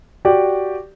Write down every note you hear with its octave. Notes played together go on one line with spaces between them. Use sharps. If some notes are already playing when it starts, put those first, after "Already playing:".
F#4 G4 D5